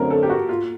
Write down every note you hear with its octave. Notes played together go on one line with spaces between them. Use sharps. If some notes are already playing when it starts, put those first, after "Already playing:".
Already playing: F#2 D3 F#3 A3 C4 A#4
A4
G4
F#4
F4